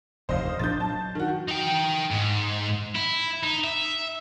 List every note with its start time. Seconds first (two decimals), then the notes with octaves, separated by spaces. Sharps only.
0.29 F1 D#2 A#2 C5 D#5 F5
0.59 A#1 C4 D4 G6 A6
0.80 F#3 A5
1.15 D#3 F#4
1.48 D#4 G5
2.12 G#2
2.95 E4
3.43 D#4
3.64 E5